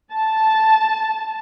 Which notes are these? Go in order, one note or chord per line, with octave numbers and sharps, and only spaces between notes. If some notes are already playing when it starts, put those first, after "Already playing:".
A5